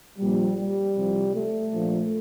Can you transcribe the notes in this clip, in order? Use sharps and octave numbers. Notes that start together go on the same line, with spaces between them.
A#1 A#2 F3 G3
G3
C2 C3 F3
A3
A#1 A#2 F3